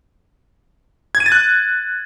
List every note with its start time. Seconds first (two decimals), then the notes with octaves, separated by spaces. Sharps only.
1.15 G#6
1.20 D#7
1.26 A6
1.32 F#6